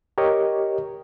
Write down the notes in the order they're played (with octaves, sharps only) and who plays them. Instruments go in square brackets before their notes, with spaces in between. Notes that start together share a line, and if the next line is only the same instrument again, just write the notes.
[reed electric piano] G4 A#4 C#5 D#5